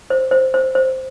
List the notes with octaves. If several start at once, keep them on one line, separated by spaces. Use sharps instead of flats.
C5
C5
C5
C5